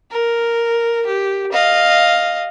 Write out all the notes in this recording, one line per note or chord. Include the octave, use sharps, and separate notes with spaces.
A#4
G4
D#5 F5